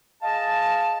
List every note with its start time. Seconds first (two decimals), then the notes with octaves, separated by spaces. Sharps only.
0.22 G#4 D#5 F5 A5